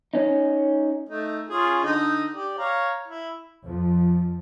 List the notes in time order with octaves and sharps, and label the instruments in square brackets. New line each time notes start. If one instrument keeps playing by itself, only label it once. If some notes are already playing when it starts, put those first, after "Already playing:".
[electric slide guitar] C#4 D#4
[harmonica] A3 D#4
C#4 F4 G#4
D3 D#4 D#5
G4 D5
C#5 F5 A#5
E4
[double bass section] F2 F3